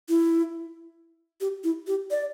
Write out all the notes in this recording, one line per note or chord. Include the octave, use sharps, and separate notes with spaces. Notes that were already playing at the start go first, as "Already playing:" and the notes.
E4
G4
E4
G4
D5